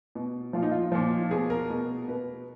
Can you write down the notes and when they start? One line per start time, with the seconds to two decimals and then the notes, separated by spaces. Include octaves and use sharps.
0.15 B2
0.53 A#2 F3 F4
0.62 D#4
0.71 F4
0.92 A#2 F3
1.31 B2 G#4
1.50 A#4
1.70 B2
2.08 B2 B4